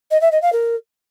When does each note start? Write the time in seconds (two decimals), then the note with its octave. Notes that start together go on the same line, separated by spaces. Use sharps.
0.11 D#5
0.21 E5
0.31 D#5
0.42 F5
0.52 A#4